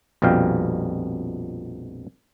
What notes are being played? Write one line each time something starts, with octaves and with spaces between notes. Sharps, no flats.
A#1 F2 B2 G3 F5 G5